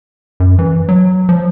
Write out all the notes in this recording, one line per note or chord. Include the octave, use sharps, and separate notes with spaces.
F#2
E3
F#3
F3